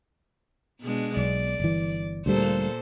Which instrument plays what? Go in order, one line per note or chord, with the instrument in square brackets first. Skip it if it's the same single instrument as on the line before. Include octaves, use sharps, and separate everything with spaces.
[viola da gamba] B2 G#3 D4
[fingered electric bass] B1 [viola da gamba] D5
[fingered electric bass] G1 E3
[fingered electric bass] D2 F#3 G3 [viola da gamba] A#2 A4 C5